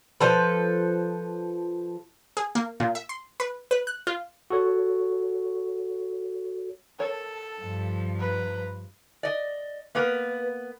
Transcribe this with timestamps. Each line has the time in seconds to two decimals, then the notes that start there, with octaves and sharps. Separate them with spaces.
0.20 F3 A4 B4
2.37 G#4
2.55 A#3
2.80 A#2
2.95 E5
3.09 C6
3.40 B4
3.71 B4
3.87 F#6
4.07 F4
4.50 F#4 A4 C#5
6.99 A4 A#4 C#5
7.62 G2 F3
8.19 B4 A#5
9.23 D5 D#5
9.95 A#3 B3 A#4 B4